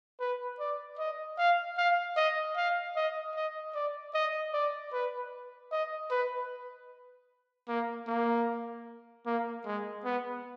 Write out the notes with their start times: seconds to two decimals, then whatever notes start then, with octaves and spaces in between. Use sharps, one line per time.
0.20 B4
0.60 D5
0.99 D#5
1.38 F5
1.78 F5
2.17 D#5
2.57 F5
2.96 D#5
3.35 D#5
3.75 D5
4.14 D#5
4.54 D5
4.93 B4
5.72 D#5
6.11 B4
7.69 A#3
8.08 A#3
9.26 A#3
9.66 G#3
10.05 B3